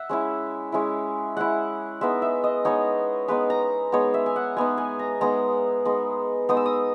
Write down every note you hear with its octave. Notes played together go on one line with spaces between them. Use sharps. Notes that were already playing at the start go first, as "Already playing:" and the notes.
Already playing: E5 F#5
G#3 C#4 E4
G#3 C#4 E4
G#3 C#4 E4 F#5
G#3 B3 D#4 E5
E5
D#5
G#3 B3 D#4 C#5
G#3 B3 D#4 B4
A#5
G#3 B3 D#4 C#5
E5
G#5
F#5
G#3 B3 D#4 G#5
G#5
A#5
G#3 B3 D#4 A#5
G#3 B3 D#4
G#3 B3 D#4 D#6
E6
D#6